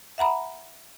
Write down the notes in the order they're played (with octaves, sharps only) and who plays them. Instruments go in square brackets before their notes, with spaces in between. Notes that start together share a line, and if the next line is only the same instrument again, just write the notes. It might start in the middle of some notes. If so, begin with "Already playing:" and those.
[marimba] E5 F#5 A#5 B5